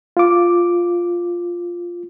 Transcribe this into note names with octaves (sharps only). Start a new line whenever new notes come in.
F4 D6